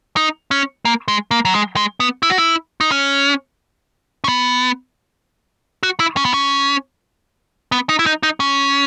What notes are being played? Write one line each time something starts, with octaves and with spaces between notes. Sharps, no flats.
D#4
C#4
A#3
G#3
A#3
F#3
G#3
G#3
B3
E4
F#4
E4
D#4
C#4
C#4
B3
F#4
E4
C#4
B3
C#4
B3
D#4
E4
D#4
D#4
C#4